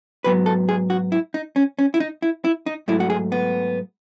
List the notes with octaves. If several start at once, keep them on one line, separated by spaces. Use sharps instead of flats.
G#2 F#3 B3 B4
A4
G#4
F#4
E4
D#4
C#4
C#4
E4
D#4
E4
E4
D#4
G#2 F#3 A3 E4
F#4
G#4
B3